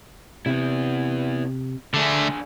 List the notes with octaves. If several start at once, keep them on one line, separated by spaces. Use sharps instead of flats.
C3 B3 E4
D3 A3 D4 G#4